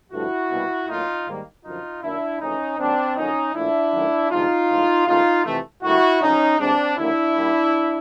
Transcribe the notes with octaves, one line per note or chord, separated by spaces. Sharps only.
G2 D3 F3 A3 E4 F#4
C2 B2 G3 A#3
A2 F#3 A#3 D#4 F4
G#2 D#3 G3 A#3
F#2 D3 F3 D#4 F4
F#2 D#3 F#3 A#3 D4 E4
F2 C#3 E3 A3 C#4 D#4
D#2 D#3 F#3 A#3 C4 D4
F2 D3 F#3 A#3 C#4 D#4
A#2 F3 A3 D4 E4
F#2 D#3 F#3 A3
D2 C3 F3 G#3 D#4 F4
A2 F3 G#3
D#2 C#3 F3 A3 D#4 F4
F2 C3 E3 A3
D2 D3 G3 A#3 E4 F#4
F2 C#3 F#3 C#4 D#4
D2 C3 E3 G#3 C4 D4
D#2 D3 F#3 A#3 D4 E4
A#2 G3 A#3